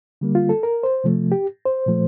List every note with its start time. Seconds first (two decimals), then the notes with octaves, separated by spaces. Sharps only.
0.21 D3 G3 A#3
0.35 F4
0.49 A4
0.63 A#4
0.83 C5
1.04 C3 F3 A3
1.32 G4
1.66 C5
1.86 A#2 F3 A3